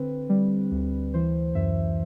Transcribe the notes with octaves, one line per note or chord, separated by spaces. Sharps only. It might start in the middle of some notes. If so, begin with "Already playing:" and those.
Already playing: D3 C4 B4
G3
D2
E3 C5
F#2 E5